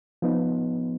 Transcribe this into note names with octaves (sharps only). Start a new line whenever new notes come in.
F3 B3 D#4